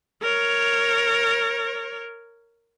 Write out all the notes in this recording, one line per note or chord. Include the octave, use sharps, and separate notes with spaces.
A#4 C#5